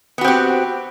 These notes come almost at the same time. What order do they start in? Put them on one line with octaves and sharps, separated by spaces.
B3 F#4 C4 G4